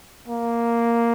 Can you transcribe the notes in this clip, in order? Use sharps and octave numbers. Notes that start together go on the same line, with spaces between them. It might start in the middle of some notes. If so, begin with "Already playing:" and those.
A#3